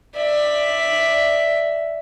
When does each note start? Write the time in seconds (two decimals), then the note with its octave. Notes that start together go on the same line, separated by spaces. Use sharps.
0.16 D5 E5